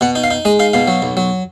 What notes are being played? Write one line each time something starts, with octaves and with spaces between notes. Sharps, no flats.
B2 F#5
D#4
F5
D#4
G#3 D#5
D#4 F5
B2 F5
F#3
B1
F#3